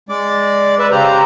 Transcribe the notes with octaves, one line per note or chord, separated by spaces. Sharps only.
G#3 D5
B4 E5
C#3 G4 C5 A#5